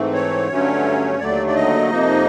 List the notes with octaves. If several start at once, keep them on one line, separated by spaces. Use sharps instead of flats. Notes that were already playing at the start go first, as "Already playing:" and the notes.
Already playing: G#2 E3 A3 C4
C#5
G2 D3 F#3 A3 C#4
D#2 D3 F#3 A3 D5
D5
D#5
F2 C3 F3 A#3 D#4